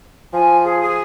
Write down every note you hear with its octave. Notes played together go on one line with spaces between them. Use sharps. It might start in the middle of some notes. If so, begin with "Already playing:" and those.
F3 G#5
G#4
G#4